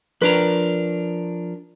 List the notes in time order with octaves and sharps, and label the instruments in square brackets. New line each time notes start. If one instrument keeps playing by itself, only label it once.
[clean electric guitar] F3 D4 A#4 [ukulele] B4